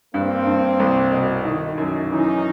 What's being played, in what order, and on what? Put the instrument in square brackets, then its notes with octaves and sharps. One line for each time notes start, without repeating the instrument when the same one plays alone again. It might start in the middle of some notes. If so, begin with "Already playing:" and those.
[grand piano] G2 [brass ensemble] A#3 C4
[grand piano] G2
C2
B2
D#3
F#2
[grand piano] E3 [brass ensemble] C#4 D#4